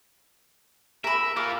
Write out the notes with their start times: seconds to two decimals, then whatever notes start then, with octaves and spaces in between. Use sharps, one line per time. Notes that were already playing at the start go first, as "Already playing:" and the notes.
1.04 A#4 E5 B5
1.37 F4 A#4 D6